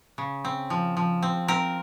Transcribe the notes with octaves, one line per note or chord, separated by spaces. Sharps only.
C#3
C4
F3
F3
C4
C4 A#4